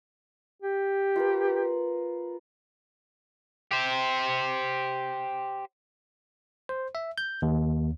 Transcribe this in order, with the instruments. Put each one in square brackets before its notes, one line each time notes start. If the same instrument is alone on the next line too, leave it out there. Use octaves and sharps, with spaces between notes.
[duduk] G4
[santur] F4 A#4 B4
[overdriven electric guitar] G4 C5
[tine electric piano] C5
E5
G6
D#2